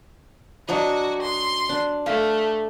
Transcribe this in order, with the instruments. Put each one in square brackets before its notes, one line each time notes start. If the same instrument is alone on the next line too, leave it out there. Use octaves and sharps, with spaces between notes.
[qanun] F#3 D4 D#5 [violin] F#4
[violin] C6
[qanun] D4
[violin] A3 [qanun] F5